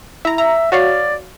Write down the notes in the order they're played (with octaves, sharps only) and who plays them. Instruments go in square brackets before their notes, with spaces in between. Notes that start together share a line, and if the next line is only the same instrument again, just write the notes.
[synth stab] E4 A#5
[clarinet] E5 [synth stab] A#5
[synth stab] F#4 C#5 F5 [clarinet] D5